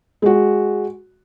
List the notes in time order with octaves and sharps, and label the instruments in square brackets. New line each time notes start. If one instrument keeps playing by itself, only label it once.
[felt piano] G#3 F#4